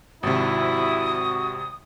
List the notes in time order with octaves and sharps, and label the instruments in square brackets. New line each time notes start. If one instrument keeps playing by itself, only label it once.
[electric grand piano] G#1 C3 [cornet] E4 [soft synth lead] F#4 [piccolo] D#6